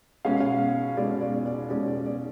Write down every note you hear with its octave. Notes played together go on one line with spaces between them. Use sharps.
B2 G#3 C#4 F5
F5
B2 G#3 C#4 D5
D5
D5
B2 G#3 C#4 D5
D5
D5